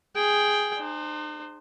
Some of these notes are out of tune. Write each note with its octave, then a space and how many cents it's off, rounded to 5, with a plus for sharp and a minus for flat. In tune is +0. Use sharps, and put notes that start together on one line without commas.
G#4 +0 G5 +0
D#4 -45 C5 +5